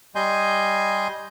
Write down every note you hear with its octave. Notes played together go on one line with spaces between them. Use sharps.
G3 D#5 G#5 C6 G6